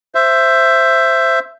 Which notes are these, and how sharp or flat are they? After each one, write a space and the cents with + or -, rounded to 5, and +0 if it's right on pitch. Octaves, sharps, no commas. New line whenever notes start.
C5 +0 E5 +15